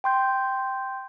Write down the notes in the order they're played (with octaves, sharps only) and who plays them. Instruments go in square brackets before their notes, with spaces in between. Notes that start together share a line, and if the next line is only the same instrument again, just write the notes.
[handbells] G5 C6 G6